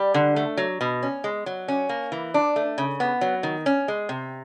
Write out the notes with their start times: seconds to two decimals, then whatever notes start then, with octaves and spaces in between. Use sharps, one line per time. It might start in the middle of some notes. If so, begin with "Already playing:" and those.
Already playing: G3
0.14 D3
0.36 A3
0.57 F#3
0.81 B2
1.03 C#4
1.24 G#3
1.46 F#3
1.68 C#4
1.89 A#3
2.12 E3
2.34 D4
2.56 A3
2.78 C#3
3.00 B3
3.21 F#3
3.43 D#3
3.66 C#4
3.88 G#3
4.09 C3